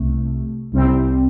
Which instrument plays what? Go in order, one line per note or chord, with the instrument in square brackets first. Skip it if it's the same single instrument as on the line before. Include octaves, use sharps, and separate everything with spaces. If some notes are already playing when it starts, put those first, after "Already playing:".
Already playing: [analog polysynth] C2 C3 A3
C2 C3 G3 C4